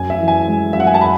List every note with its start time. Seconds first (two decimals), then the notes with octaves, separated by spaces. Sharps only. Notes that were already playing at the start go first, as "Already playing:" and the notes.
Already playing: F#2 G#5
0.10 E5
0.19 E3
0.28 G#5
0.47 G#3
0.73 F#2 E5
0.80 F#5
0.87 G#5
0.94 A5
1.01 B5